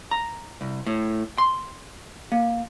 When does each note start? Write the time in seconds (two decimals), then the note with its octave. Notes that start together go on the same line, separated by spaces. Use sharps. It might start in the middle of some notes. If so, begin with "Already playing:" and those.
0.11 A#5
0.61 C2
0.86 A2
1.38 C6
2.32 A#3